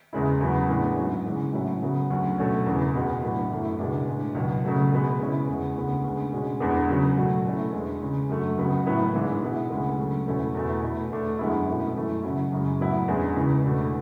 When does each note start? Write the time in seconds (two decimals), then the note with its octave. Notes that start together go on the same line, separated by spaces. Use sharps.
0.13 E2 C#3 G#3 C#4 E4
0.41 E2 C#3 F#3 B3
0.69 A2 G#3 B3 D4
0.97 G#2 F#3 C#4
1.26 C#3 E3 G#3 C#4
1.53 A2 F#3 C#4 E4
1.82 C#3 F#3 B3
2.10 D2 C#3 F#3
2.38 B2 F#3 A3 C#4
2.66 E2 C#3 E3
2.94 C#2 B2 G#3 B3
3.22 A2 F#3 B3 D4
3.50 F#2 E3 A3 E4
3.79 C#2 B2 G#3 D4
4.07 A2 G#3 D4
4.35 C#2 B2 F#3
4.64 C#3 F#3 A3
4.91 B2 G#3 B3
5.19 C#3 G#3 C#4 E4
5.48 E2 C#3 G#3 B3
5.76 D2 C#3 G#3 B3
6.04 D2 C#3 G#3
6.33 B2 G#3 C#4
6.60 E2 D3 G#3 B3 D4
6.89 C#3 F#3 C#4
7.17 B2 F#3 A3 C#4
7.45 B2 A3 C#4 E4
7.73 E2 D3 G#3
8.02 C#3 G#3 C#4
8.29 F#2 D3 F#3 A3
8.58 C#2 C#3 F#3 B3
8.86 A2 F#3 B3 E4
9.14 G#2 E3 G#3 D4
9.42 B2 G#3 B3 E4
9.70 D2 C#3 G#3 B3
9.98 C#3 F#3 A3
10.27 E2 B2 A3 C#4 E4
10.54 E2 B2 A3 E4
10.83 B2 A3 E4
11.11 E2 D3 A3 D4
11.39 F#2 D3 G#3 B3 E4
11.67 B2 A3 C#4 E4
11.95 F#2 E3 A3 E4
12.23 C#3 F#3 C#4 E4
12.52 F#2 C#3 G#3
12.80 A2 F#3 B3 E4
13.08 E2 D3 G#3 C#4
13.36 C#2 C#3 E3
13.64 E2 B2 A3 D4